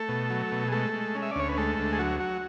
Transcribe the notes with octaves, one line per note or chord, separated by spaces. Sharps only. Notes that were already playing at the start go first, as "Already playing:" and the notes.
Already playing: A3 A4
B2
F#3
B2
G#4
G#3 A3 A4
G#3
C#4
E5
D5
D2 C#5
B4
G#3 A3 A4
D2
G#4
F#3 F#4
F#3